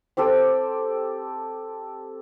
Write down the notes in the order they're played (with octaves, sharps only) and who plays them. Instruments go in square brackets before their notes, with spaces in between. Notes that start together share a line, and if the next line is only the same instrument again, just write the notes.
[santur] C4 G4 A4 G5